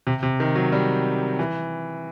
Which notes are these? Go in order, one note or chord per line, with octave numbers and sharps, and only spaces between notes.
C3
C3
D#3
F#3
G3
E3